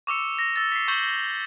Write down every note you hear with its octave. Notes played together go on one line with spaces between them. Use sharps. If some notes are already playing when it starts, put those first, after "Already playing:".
C#6 D6 E6 C#7
A#6
E6 A6
B6 C7
C#6 G6 F#7 G7